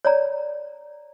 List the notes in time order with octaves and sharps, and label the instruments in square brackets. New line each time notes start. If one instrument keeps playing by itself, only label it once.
[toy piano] C#5 D5 A#5